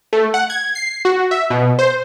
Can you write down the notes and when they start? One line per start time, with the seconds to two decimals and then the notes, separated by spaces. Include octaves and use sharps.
0.13 A3
0.34 F#5
0.50 G#6
0.75 C7
1.05 F#4
1.31 E5
1.50 B2
1.79 C5